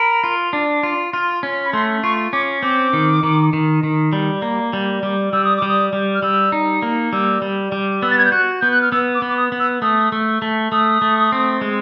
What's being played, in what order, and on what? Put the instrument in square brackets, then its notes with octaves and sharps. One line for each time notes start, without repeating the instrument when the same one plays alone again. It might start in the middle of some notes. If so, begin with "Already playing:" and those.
Already playing: [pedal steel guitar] A#4 [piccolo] B5
[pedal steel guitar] F4
D4
F4
F4
C#4
[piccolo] B5
[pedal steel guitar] A3 [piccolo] C6
[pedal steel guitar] F4 [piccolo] C#6
[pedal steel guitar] C#4 [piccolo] D6
[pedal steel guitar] C4 [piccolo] D6
[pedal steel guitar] D#3
D#3
D#3
D#3
G3
A#3
G3
G3
[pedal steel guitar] G3 [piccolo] E6
[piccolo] D#6
D6
[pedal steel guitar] G3
[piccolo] D#6
[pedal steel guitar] G3
[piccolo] F6
[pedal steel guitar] G3 [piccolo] E6
[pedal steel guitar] D#4
A#3
[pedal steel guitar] G3 [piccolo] E6
[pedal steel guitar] G3
G3
[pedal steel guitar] B3 [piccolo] E6
[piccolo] A6
G#6
G6
[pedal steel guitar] F#4 [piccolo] F#6
[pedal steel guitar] B3 [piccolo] G6
[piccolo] F#6
F6
[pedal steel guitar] B3 [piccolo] E6
[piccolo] D6
[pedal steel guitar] B3
[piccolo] D6
D#6
[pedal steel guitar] B3
[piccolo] E6
[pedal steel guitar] A3 [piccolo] D#6
[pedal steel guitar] A3
A3
[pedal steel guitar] A3 [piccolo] D#6
[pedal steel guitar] A3
C4
G#3